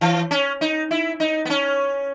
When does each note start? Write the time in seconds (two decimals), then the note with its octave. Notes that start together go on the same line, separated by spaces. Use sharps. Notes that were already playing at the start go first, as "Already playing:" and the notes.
0.01 E3
0.31 C#4
0.61 D#4
0.91 E4
1.20 D#4
1.45 B3
1.50 C#4